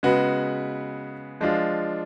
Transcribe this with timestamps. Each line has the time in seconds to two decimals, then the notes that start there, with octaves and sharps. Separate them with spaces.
0.03 C#3 G#3 B3 F#4 B4
1.40 F3 G#3 D4 F4